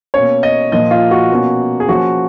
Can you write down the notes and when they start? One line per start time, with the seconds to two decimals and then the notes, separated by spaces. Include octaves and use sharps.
0.14 B2 A#3 C#4 C#5
0.43 D#5
0.72 A#2 F3 A#3 D#5
0.91 F4
1.11 F#4
1.30 B2 A#3 C#4
1.80 G#4
1.89 F3 A#3 C#4 F#4